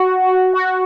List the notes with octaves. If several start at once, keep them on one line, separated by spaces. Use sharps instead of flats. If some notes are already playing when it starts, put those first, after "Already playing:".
Already playing: F#4
F#4